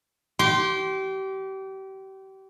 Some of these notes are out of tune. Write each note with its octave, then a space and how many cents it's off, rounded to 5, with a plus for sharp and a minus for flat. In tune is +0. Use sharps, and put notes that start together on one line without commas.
G4 -30 C6 +5